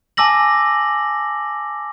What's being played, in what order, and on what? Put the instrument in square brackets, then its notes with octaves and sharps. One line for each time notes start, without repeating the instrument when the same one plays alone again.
[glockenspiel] G#5 A5 D6 E6 A#6 F#7